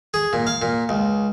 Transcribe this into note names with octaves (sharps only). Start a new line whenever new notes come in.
G#4
A#2
F5
A#2
C#2